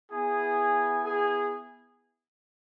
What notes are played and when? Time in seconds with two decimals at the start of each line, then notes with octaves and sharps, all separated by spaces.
0.12 B3 E4 G#4 G#5
1.05 G#4 G#5